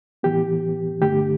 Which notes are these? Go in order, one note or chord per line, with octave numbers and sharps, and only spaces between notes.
A2 E3 B3 G4
G2 D3 A3 G4